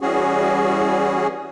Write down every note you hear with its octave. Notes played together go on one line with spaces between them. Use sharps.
E3 G3 C#4 F#4 G#4